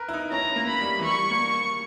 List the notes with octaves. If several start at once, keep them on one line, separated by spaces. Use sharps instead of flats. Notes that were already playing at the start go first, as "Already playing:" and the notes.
Already playing: A#4 B4
E4
D#4
C#4 A#5
A#3
B5
G3
E3
G3 C#6
A#3